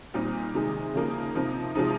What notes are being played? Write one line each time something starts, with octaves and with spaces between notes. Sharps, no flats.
A#2 G3 C4 D#4
C3 D#3 G#3 D#4
C#3 F3 A#3 D#4
C3 F3 C4 D#4
C3 F3 G#3 C4 D#4